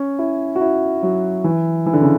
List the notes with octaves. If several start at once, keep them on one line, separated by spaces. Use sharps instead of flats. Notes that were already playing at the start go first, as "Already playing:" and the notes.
Already playing: C#4
E4
F#4
E4
F#3
E3
E3
D3
C#3